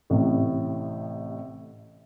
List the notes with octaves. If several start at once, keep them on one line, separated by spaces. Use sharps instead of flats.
A1 A2 C3